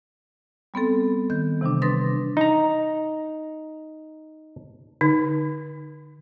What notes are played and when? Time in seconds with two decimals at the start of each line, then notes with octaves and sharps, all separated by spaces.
0.74 G3 B3 C4 A4
1.30 D#3 G6
1.61 C3 E3 G3 D4
1.82 D4 B4 C6 D#6 A6 A#6
2.37 D#4 A#5
5.01 D3 D#4